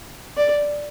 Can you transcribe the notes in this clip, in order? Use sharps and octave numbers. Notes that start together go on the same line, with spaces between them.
D5